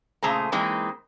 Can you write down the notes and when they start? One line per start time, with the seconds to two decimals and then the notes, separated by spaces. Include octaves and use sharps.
0.23 A#2 C#3 A3 G#4 C5 A#5
0.52 E3 G#3 A#3 C4 D#4